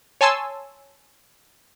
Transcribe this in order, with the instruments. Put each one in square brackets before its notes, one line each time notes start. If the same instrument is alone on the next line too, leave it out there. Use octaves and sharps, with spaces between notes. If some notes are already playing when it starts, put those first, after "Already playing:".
[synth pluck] C#5 G#5 A5 C6 E6